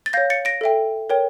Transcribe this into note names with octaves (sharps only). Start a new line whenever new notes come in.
A6
C#5 F5 G6 A#6
A6 C#7
A#6 D7
A4 E5 G5
A#4 C#5 G5